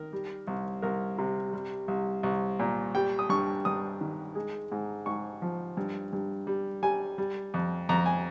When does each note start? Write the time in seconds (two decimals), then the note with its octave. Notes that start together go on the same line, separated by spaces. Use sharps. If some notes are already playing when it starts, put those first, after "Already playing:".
Already playing: D#3 A#4
0.13 G3
0.47 C2
0.82 C2 A#4
1.18 C3
1.53 G3
1.88 C2
2.23 C2
2.59 A#2
2.95 G3 G5
3.19 D#6
3.29 G2 C#6
3.65 G2 D#6
4.01 D#3
4.35 G#3
4.72 G#2
5.06 G#2 C#6
5.42 F3
5.77 G2
6.13 G2
6.47 G3
6.82 G3 G#5
7.18 G3
7.54 F2
7.89 F2 A#5
8.06 G#5